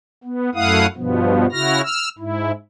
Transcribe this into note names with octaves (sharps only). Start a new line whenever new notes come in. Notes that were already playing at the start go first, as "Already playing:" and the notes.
B3
F#2 A3 E4 F5 F#5 D#6
G2 B2 F3 B3
C#3 E4 F#4 F6 A#6
E6 F6
G#2 E4